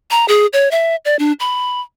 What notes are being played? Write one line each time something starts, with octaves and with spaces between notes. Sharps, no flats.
A#5
G#4
C#5
E5
D5
D4
B5